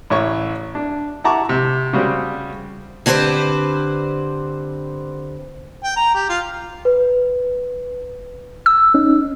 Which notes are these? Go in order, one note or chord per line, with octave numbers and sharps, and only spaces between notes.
A1 E4 C#5 C#6
D4
E4 F#5 A5 A#5 C#6 D6
C3
C#3 G3 F#4 C5
D3 C4 G4 B4 C5
G5
A#5
G4
F4
B4
E6
C#4 D#4